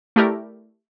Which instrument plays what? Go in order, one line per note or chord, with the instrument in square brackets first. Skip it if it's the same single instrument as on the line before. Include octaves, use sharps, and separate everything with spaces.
[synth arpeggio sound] A3 E4 G4 A#4 D5